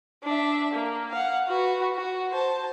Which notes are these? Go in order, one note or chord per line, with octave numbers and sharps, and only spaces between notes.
D4 E5
A#3
F5 F#5
F#4 B4
F#4
C5 A5